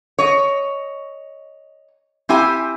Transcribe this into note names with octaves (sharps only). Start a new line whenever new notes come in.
C#5 D#5
C4 E4 G4 G#5